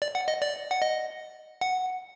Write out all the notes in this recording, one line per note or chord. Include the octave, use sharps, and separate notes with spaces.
D5
F#5
D#5
D5
F#5
D#5
F#5